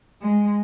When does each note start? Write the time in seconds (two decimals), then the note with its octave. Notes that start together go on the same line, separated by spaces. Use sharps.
0.22 G#3